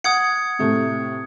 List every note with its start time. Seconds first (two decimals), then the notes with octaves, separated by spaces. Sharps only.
0.04 F#5 D#6 G#6 C#7
0.59 A2 C3 A3